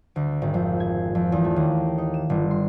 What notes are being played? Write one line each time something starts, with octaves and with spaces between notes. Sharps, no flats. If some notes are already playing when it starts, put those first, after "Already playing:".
D2
G#1
F2
G#6
F2
E2
A3
D#2
D#4
E7
G1
C6